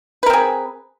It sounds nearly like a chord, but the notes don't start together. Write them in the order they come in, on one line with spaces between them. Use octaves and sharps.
B4 A#4 C4 G#4